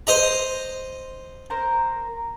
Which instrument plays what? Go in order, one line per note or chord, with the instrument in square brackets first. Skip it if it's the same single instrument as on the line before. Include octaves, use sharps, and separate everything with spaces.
[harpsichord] C5 D#5 A#5
[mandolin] A#4 C5 A#5